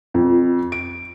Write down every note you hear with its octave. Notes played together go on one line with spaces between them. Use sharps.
F2
D7